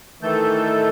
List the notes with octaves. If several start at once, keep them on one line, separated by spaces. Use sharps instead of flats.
D#3 E3 A3 A4 G6